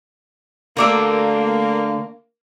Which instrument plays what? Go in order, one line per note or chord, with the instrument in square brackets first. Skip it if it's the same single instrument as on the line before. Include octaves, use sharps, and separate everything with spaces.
[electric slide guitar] D3 A3 D4 [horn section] A#3 [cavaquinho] A#4 D5 E5